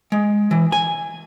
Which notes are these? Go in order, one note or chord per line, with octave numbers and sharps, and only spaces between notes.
G#3
E3
G#5